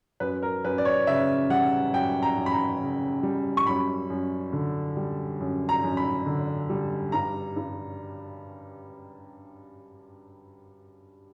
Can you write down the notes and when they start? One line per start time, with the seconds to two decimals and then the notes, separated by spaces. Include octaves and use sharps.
0.20 F#2 B4
0.42 A#4
0.64 F#2 B4
0.78 D5
0.85 C#5
1.07 C#3 E5
1.50 G3 F#5
1.94 F#2 G5
2.23 A#5
2.37 F#2
2.46 B5
2.51 A#5
2.81 C#3
3.23 G3
3.57 C#6
3.67 F#2 B5
4.10 F#2
4.53 D3
4.97 G3
5.40 F#2
5.69 A#5
5.83 F#2
5.97 B5
6.26 D3
6.70 G3
7.12 G2 A#5
7.56 G2